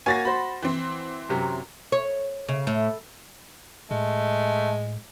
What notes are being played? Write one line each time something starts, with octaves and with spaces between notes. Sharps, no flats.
A#3 F#4 C#5 G#5 A6 A#6
F#4 C5 B5
E3 C4
F#2 C3 F#3
C#5
C#3
A2
A2 G#3 A3